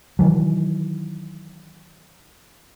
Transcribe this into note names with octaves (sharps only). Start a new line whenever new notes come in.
D#3 E3 F#3